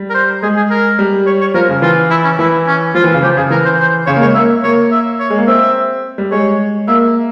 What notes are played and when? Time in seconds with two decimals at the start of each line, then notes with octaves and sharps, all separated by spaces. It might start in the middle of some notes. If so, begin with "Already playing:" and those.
Already playing: G3
0.10 A#4
0.14 C5
0.42 G#3 G#4
0.57 G#4
0.70 A#4
0.99 G3
1.27 C#5
1.41 C#5
1.54 F3 A#4
1.69 C#3
1.82 E3 F4
2.10 E4
2.25 C#4
2.39 E3 E4
2.67 C#4
2.95 F3 F4
3.04 E3
3.14 C#3
3.22 F3 G4
3.37 C#3 G#4
3.50 E3 A#4
3.65 C5
3.79 C5
4.07 C#3 C#5
4.16 A#3
4.21 G#3 C#5
4.35 A#3 E5
4.63 A#3 C#5
4.92 E5
5.19 C#5
5.30 G#3
5.38 A#3
5.48 C4 E5
6.18 G3
6.31 G#3 C#5
6.88 A#3 E5